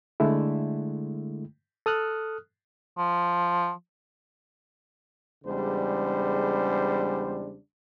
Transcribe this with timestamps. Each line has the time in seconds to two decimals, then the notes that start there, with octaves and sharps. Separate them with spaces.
0.20 D3 G#3 A3 E4
1.86 A4 D#6 F6 F#6
2.98 F3
5.44 E2 C#3 G3 G#3 D4 C5